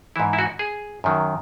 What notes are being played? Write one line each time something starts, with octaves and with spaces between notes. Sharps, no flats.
G#2 E3 E4
E4
F#4
G#4
F#2 D#3 F#3